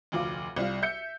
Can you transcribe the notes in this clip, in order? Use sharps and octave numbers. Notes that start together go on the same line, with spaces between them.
F1 D2 F4 D6
C2 G3 F4
E5 G6 C#7